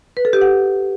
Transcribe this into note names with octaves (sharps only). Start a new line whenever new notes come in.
B4
A4
G4
F#5